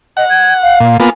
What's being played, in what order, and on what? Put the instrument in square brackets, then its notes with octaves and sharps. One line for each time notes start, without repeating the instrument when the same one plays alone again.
[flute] D#5 [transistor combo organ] F#5
[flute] G#6
F5
[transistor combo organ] A#2
[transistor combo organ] A#3 B3 F4 [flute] G#5